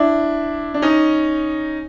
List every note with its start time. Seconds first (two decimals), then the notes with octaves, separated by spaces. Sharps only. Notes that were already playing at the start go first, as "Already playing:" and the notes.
Already playing: D4 E4
0.74 D4
0.82 C#4 D#4